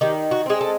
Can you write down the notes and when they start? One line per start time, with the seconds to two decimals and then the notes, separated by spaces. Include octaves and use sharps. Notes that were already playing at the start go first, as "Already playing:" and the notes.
0.01 D#3 G4
0.31 F#4
0.46 G#3 C4 G#4
0.61 A4